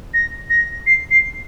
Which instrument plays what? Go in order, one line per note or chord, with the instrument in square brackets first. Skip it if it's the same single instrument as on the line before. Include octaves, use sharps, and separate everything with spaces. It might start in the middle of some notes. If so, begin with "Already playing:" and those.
[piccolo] A#6
A#6
C7
C7